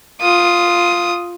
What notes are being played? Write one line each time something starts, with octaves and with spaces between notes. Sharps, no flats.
F4 D#6